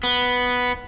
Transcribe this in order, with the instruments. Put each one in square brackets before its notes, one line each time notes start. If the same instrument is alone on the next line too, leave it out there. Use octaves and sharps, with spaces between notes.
[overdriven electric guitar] B3